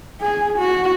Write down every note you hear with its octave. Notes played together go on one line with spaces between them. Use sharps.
G#4
F#4